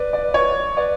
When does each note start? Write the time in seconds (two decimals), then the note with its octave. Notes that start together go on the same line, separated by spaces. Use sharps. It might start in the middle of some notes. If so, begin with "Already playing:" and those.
Already playing: B4 D5
0.13 D5
0.34 C#5
0.76 B4 D5